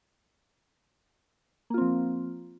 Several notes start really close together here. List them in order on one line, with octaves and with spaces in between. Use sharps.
A#3 F4 C4 F3